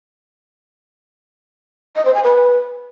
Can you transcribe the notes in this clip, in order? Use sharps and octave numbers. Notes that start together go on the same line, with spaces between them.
D#5
C5
G#5
B4